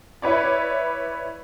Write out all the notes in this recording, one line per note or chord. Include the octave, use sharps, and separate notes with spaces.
E4 B4 C#5 D5